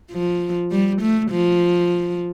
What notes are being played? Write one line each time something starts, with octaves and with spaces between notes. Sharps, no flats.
F3
G3
A3
F3